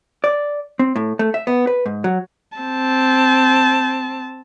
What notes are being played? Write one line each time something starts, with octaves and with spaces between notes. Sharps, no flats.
D5
C4
A2
A3
E5
B3
B4
G#2
F#3
C4 A5